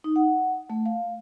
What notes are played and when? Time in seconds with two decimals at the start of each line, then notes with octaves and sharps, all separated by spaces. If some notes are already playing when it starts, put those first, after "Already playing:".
0.04 D#4
0.16 F#5
0.70 A3
0.86 F5